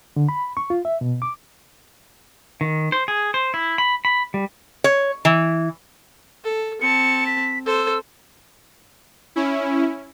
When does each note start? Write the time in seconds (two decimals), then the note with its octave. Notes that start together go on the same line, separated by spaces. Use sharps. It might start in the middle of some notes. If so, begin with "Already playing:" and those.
0.16 D3
0.29 B5
0.57 C#6
0.70 F4
0.85 E5
1.01 B2
1.22 D6
2.61 D#3
2.92 C5
3.08 G#4
3.34 C5
3.54 E4
3.78 B5
4.05 B5
4.34 G3
4.84 C#5
5.25 E3
6.44 A4
6.81 C4 A5 C#7
7.26 B6
7.66 A4 C5 E6
9.36 C#4 E4